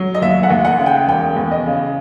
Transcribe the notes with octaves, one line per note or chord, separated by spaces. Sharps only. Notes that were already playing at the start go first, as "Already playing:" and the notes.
Already playing: F#3
D#5
D#2 E5
F#5
D#2
F#5
C#3
G5
E1 G5
E2
D#5
C#3